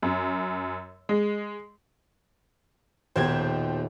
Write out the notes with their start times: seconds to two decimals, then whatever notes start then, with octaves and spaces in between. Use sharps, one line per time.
0.02 F#2
1.09 G#3
3.16 D#1 B2 G4 C5 G6 G#6